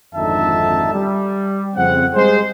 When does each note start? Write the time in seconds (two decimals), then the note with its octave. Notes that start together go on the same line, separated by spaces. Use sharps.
0.15 G#1 F2 D3 D#4 E5 A5
0.93 G3
1.76 F2 C#3 C4 F#5
2.15 G3 G#3 G#4 C5